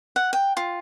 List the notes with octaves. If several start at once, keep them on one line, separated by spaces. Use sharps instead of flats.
F#5
G5
F4